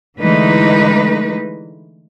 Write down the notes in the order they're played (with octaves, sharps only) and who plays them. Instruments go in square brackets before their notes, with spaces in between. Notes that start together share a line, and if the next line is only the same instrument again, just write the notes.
[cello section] D3 E3 G#3 A3 D#4 B4